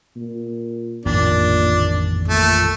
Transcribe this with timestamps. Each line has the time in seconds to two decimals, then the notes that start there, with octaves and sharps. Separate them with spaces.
0.17 A#2
1.06 A1 F2 A#2 D#3 D4
2.28 A#2 A3